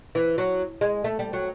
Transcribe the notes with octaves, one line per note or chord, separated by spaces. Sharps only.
E3
F#3
G#3
A3
G3
F#3